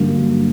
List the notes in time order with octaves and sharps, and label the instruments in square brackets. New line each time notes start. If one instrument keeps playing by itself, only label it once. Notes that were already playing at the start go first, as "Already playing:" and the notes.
Already playing: [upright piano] G2 D3 F#3 A#3